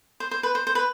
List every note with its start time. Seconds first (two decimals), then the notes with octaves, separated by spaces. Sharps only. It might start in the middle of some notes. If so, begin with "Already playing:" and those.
0.20 C5
0.31 C5
0.43 B4
0.55 C5
0.67 C5
0.75 B4